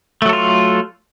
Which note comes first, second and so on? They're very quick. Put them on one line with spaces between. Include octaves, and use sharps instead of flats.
A3 F#3 A4 F4